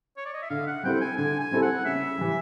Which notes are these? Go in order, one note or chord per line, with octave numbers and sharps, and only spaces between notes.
C#5
D5
D#5
E5
D3 F5
F#5
G3 C4 E4 A4 G5
G#5
D3 G#5
G#5
G3 C4 E4 A4
F#5
C#3 E5
E3 G3